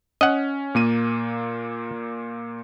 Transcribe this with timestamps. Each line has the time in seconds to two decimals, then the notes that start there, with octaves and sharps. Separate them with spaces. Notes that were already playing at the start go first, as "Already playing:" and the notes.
0.21 C#4 D#5 F#5
0.75 A#2 A#3 D#7